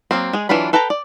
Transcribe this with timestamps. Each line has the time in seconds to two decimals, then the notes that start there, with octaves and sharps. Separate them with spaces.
0.11 F#3 G3 A#3 C4
0.33 G#3 G#4
0.49 E3 F#3 D4 F4 B5
0.73 A4 B4 G5 A5 A#5
0.90 D5